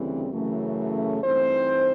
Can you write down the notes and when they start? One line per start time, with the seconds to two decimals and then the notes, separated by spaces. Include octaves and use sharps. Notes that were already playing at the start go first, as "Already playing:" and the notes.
Already playing: D2 C#3 E3 G3 C4
0.30 F#2 C#3 E3 A3
1.22 G2 E3 A3 C4 D#4 C5